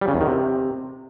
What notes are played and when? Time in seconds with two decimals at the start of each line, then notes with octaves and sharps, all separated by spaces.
0.01 G3
0.08 C#3
0.14 E2
0.21 D#3
0.27 C3